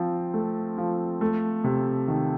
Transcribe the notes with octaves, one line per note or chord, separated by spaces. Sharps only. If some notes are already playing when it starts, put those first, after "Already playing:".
Already playing: F3 C4
A3
F3
A3
C3
D#3